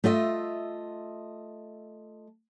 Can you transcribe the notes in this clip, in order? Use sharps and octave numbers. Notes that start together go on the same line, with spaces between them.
A3 F4 D#5 E5